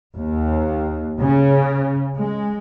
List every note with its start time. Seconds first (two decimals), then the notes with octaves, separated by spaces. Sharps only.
0.16 D#2
1.21 C#3
2.18 G#3